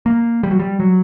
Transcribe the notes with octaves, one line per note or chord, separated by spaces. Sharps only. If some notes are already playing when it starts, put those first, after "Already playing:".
A#3
G3
F#3
G3
F#3